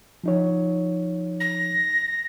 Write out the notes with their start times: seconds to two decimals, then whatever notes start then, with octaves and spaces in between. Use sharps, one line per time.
0.24 F3 D#4 C#5
1.40 A#6